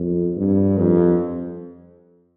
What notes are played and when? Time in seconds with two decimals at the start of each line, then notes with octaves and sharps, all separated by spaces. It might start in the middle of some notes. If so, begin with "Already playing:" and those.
Already playing: F2
0.36 G2
0.77 F2